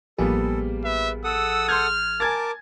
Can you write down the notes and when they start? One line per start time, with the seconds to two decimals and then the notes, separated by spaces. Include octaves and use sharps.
0.18 A1 F3 G3 A#3 B3 G#4 A4
0.84 B4 E5
1.24 A4 F#5 D#6 E6
1.69 C6 F6 G6 G#6
2.20 A#4 G#5 A5 D6 G#6 A6